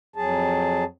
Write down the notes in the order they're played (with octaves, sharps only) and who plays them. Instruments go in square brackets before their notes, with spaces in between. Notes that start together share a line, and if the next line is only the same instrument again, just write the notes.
[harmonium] F2 F#3 G#4 A5